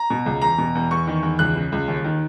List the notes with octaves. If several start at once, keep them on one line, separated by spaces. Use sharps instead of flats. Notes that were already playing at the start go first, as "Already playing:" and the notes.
Already playing: A#5
B2
C#2
E2 A#5
B2
E2
E2 C#6
D#3
E2
C#2 F#6
C#3
C#2
D#2
D#3